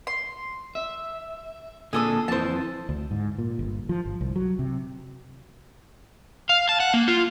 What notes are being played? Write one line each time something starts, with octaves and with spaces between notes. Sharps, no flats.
C6
E5
A#2 D3 G#4 A4 D#6
F2 E3 C5 A5
D2
G#2
A#2
G1
F3
G1
C2
F#3
C3
F5
A5
F#5
A#3
F4